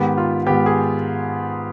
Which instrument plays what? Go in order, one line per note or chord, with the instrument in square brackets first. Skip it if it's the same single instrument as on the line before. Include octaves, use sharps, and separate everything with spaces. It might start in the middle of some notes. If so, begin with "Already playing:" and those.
Already playing: [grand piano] G#2 D#3 B3 G4
F4
G#2 D#3 B3 G4
G#4